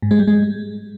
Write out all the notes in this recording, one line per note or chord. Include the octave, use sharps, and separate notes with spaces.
G#2
G#3
G3
G#3